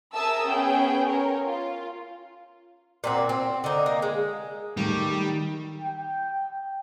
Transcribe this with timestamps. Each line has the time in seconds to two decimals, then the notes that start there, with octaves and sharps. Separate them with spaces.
0.15 G#4 A#4 E5 A5 D#6 E6
0.45 B3 C#4 G#4 G5
1.07 A#4 C#5
1.45 F4
3.04 A#2 C4 F#4
3.29 C4
3.64 D3 D#4
3.86 A#3
4.02 G#3
4.77 D#3 G3 A3
5.82 G5